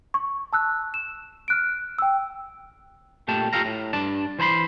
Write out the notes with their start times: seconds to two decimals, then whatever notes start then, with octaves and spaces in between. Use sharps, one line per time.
0.14 C#6
0.53 A5 E6 F#6
0.94 E7
1.48 F6 F#6 D7
1.98 G5 E6
3.28 A#2 A3 G4 A5
3.53 F4 G4 A4 F5 A#5
3.65 A2
3.93 G2 D4 A5
4.39 E3 C5 G#5 B5 C6